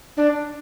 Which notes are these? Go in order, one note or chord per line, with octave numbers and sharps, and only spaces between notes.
D4